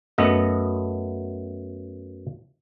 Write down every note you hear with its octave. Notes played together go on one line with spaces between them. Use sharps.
F#2 A3 B3 D#5